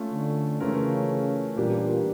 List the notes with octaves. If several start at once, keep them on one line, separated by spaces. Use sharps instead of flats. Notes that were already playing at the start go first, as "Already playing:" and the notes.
Already playing: A3 C#4 F4 A4
D3
C#3 E3 A3 C#4 F4 A#4
A#2 E3 G3 A#3 D4 G4